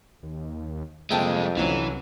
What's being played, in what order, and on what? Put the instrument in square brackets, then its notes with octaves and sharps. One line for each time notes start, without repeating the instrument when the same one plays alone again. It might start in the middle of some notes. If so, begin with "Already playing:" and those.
[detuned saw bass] D#2
[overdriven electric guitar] C2 G#3 [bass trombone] F2 [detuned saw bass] A#3 [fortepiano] E5 G5 A5
[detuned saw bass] C2 [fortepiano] D3 F#3 C#4 [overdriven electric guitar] E3